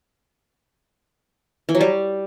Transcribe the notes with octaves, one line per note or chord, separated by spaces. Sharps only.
E3
F#3
G3